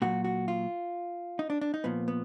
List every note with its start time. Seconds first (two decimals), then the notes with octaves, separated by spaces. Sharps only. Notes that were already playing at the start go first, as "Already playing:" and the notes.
0.02 A#2 F#3 F#4
0.24 F#4
0.48 F4
1.39 D#4
1.50 D4
1.61 D4
1.74 D#4
1.84 A#2 F3 B3
2.08 B3